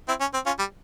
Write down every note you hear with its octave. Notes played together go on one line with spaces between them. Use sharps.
C4 E4
C#4
C4
C#4 F4
G3